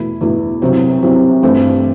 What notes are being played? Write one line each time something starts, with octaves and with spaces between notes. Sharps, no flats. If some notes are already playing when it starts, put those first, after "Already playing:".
Already playing: E2 B2 A3 E4
E2 B2 A3 E4
C2 C3 F#3 C4
C2 C3 F#3 C4
G2 E3 A3 C4